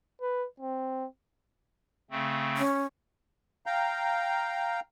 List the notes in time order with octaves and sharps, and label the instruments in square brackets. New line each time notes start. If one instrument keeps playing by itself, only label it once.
[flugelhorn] B4
C4
[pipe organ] C#3 A3 C4
[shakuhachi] C#4
[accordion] F5 G5 A#5